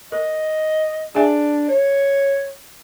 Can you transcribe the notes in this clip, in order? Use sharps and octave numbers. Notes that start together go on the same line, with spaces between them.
A#4 D#5
D4 G#4 E5 G#5
C#5